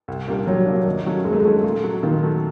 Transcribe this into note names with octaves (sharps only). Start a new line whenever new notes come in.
C2
A#2 G3 A#3 D4
C2 F#3
A#2 G3 A#3 D4
D#2
D#3 F#3 A3 C#4
D#2 G#3
A3
G#3
D#3 F#3 A3 C#4
A#2
F#3 A3
A#2 D#3
F#3 A3